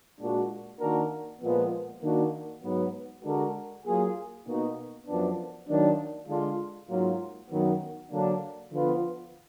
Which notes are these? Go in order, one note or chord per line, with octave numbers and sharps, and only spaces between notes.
A#2 G#3 D4 F#4
D#3 A#3 D4 F#4 A#4
A#2 F3 G#3 B3
D#3 A#3 D4 F#4
G#2 F#3 B3
D3 G#3 D4 F#4 A#4
F#3 A#3 F4 G#4
B2 A#3 D#4 F#4
F#2 F3 B3 D4
D#3 F#3 A#3 D4
D3 G#3 D4 F4
G#2 F#3 A#3 F4
F#2 D#3 F#3 B3
D3 F#3 A#3 D4
D3 F3 B3 F4 B4